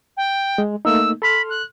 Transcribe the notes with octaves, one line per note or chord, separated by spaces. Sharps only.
G5
G#3
A3 A#3 D#4 E6
A4 B5 C6 F6
F#6